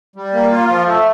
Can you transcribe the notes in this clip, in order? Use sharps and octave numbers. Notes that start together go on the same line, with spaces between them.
G3
A#3
F4
F3
A3